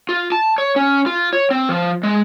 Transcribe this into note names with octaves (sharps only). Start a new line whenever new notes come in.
F4
A5
C#5
C#4
F4
C#5
C4
F3
G#3